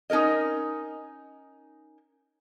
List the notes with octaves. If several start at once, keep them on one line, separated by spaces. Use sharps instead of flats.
C#4 D#4 A4 A#4 D#5